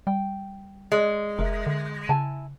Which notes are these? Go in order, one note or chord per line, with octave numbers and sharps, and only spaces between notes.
G3 G5
G#3 D5
F1 A#4 E5
D3
C#3 E4 G#5 A5